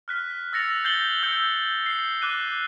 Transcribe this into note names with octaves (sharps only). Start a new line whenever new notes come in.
F6 F#6 B6
E6 A6 A#6 C#7 F7
G6 A6 C7 C#7 F#7 G7
E6 G6 C#7
C7
D6 F#6 D#7